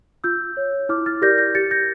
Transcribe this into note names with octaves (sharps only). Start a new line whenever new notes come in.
F4 E6 G6
C#5
E4 D6 F6
F6 A6
G4 A#4 D5 G6 A#6
G6 A#6
G4 A6 C#7
G6 A#6